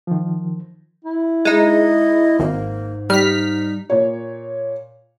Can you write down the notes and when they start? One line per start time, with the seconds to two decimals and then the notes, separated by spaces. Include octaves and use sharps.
0.07 D#3 F3
1.04 E4
1.45 G#3 D#4 D#5
2.40 G#1 G#2 A#3
3.10 G3 D#4 F6 B6
3.90 A#2 C#5